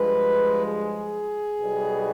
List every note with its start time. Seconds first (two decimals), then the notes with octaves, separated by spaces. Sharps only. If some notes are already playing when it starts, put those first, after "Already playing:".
Already playing: G2 F3 G#3 B4
0.65 G#4
1.59 B1 B2 G3